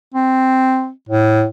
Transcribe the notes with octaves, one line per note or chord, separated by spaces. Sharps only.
C4
A2